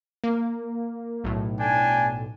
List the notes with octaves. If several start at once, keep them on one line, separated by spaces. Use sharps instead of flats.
A#3
B1 A2
D4 G5 G#5